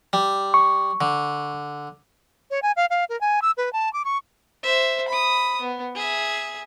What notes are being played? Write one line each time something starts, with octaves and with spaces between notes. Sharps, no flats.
G3
C#6
D3
C#5
G#5
F5
F5
A#4
G#5
E6
B4
A5
D6
C#6
C5 E5
B5 D#6
B3
G#4 E5